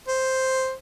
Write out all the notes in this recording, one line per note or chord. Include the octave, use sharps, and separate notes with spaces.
C5